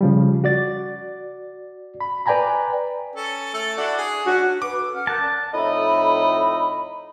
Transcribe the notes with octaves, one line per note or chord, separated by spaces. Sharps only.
C#3 F3 G3
F#4 D5 A6
B5
B4 D5 G5 G#5 A#5 B5
C#4 A4
A3 A4
D4 E4 F#4
G#4
C#4 D4 F#4
B4 D6
A4
C#4 F#5 F6
A#4 A5 F#6 G6
C#4 D5
F2 A2 D#4 D#5 E5 B5